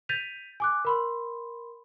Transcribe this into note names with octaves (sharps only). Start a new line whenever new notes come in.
G6 A6 B6 D#7 F7
G#5 D6 F#6
A#4 B5 C6